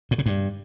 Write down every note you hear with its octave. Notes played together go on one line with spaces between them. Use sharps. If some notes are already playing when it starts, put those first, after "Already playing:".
A2
C#3
G2